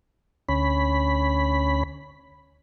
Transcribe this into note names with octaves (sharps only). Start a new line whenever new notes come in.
D2 C#4 B5